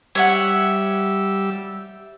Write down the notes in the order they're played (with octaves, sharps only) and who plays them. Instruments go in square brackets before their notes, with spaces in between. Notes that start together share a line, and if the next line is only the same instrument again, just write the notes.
[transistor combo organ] G3 E6 [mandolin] C#5 E5 F#5